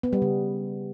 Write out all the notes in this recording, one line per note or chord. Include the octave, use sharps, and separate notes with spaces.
B3
G3
C#3